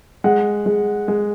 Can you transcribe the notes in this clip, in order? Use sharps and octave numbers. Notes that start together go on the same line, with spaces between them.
G#3 F#5
G#3
G#3